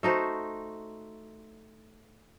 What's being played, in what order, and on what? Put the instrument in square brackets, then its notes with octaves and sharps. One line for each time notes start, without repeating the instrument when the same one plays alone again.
[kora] A3 D#4 F#4 C5